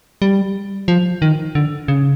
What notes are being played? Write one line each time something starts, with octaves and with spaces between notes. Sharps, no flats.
G3
F3
D#3
D3
C#3